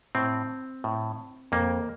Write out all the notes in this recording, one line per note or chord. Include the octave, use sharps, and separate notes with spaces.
A2 C4
A2
F2 A#3